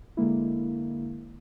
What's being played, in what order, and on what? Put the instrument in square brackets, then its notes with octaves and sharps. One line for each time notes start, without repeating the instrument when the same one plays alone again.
[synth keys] D3 G#3 A#3 E4